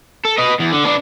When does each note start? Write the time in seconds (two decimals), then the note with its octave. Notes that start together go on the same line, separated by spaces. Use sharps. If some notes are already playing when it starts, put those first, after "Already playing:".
0.25 A4
0.38 B4 D#5
0.59 E2
0.72 D3
0.85 B3 D4